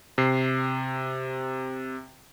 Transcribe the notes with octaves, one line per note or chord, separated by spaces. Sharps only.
C3 C7